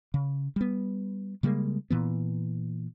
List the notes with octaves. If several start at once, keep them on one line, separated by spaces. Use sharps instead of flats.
C#3
G3 B3
C#3 G3 G#3 A#3
A#2 E3 B3